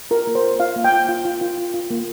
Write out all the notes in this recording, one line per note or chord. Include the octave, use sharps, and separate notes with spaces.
F4 A#4
A#3
C5
F4
F4 F5
A#3
G5
F4
F4
F4
F4
F4
F4
A#3